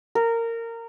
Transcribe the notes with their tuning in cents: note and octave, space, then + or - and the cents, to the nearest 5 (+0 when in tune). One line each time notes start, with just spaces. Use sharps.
A#4 -20